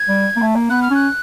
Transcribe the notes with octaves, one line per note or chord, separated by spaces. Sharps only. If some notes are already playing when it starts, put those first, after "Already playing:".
Already playing: G#6
G3
A#3
A3
A#3
B3 F#6
F6
C#4 F#6